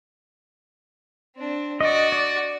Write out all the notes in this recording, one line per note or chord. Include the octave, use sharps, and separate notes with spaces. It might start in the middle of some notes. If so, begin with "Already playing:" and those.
C4 D4
F#4 D5 D#5
D5